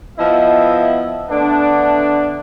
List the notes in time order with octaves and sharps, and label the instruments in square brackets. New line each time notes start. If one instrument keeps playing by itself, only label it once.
[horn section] F3 B3 E4 D#5 E5
D3 A3 B3 D4